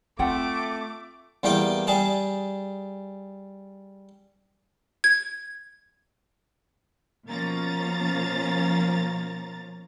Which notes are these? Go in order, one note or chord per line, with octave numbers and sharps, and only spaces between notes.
A3 C4 F4 F#5 G5 D6
E2 G3 A#3 G5 D6
G3 G#4 A5
G#6
B2 F3 A#3 C#4 A#5 A6